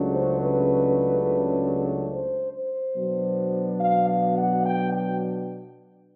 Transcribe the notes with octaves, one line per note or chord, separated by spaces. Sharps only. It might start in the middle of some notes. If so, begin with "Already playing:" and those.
Already playing: C#2 C#3 F#3 A3 D4
C5
B4
C5
C5
B2 F#3 B3 D4
F5
F5
F#5
G5
G5